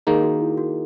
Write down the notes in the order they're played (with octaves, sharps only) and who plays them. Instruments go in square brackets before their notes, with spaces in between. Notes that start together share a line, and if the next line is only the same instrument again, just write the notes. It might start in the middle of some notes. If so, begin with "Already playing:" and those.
[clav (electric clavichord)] D#3 A#3 D#4 [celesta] G#4
[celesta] F#4
E4
F#4